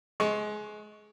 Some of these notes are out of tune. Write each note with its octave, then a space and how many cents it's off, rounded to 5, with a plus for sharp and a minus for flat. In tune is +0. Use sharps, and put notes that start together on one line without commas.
G#3 +25 C#6 +0